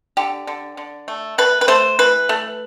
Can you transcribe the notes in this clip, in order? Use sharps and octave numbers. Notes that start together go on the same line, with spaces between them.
D3 G4
D3
D3
A3
A3 B4
B4
A3 C5
E3 B4
A3